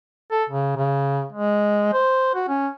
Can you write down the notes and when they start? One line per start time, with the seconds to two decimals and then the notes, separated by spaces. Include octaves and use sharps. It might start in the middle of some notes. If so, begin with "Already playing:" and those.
0.31 A4
0.49 C#3
0.77 C#3
1.32 G#3
1.93 C5
2.35 F#4
2.48 C#4